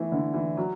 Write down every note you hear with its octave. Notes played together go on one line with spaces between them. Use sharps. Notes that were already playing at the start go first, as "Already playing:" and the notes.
Already playing: E3 A3 B3
D3
E3
F#3